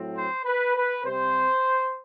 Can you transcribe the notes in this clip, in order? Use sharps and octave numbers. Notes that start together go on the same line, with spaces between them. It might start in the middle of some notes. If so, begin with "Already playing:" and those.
Already playing: A2 F#3 C4
C5
B4
B4
C3 G3 C4 C5